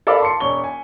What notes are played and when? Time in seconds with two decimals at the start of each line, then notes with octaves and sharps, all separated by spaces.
0.07 A4 A#4 D5 F5 B5 D6
0.20 A5 C6 C#7
0.40 E1 C#5 C#6 G7
0.64 G#5